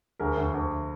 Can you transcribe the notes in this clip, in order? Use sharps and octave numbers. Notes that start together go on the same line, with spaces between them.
D2 G#4 A#4
D2
D2